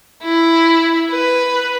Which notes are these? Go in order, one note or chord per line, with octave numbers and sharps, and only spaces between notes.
E4
B4